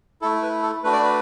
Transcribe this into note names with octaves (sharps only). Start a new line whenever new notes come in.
A3 E4 A4
B4
A4
A3 D4 F#4 B4
D5
B4